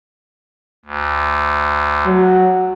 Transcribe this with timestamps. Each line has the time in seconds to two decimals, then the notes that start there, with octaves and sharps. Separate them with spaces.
0.85 D2
2.06 F#3